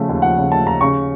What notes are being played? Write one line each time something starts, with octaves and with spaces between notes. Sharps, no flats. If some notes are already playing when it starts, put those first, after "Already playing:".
Already playing: C#3 F3 A3
D#2
F3 F#5
C#3
A3 A5
D#2 A#5
C#3 C#6